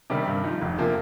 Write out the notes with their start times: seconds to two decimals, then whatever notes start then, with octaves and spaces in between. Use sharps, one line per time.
0.10 C3 D#3 G3
0.27 G2
0.44 F3 D#4
0.61 F1
0.78 C3 F3 A#3